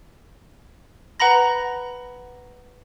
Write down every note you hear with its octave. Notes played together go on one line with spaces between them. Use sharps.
B4 F#5 A#5 B5 A#6